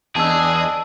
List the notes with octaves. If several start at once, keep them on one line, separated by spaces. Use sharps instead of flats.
E2 D4 G#4 D#5 A5 E6